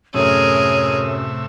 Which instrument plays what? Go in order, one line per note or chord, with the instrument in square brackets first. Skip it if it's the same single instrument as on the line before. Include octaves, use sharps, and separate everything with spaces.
[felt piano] F#2 A3 [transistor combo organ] A2 C3 E5 [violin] G#4 A#4 [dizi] C#5